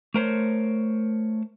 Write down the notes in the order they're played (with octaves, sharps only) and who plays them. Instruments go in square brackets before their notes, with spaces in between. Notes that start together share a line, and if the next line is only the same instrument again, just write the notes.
[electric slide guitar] A3 A#4 C5 C#5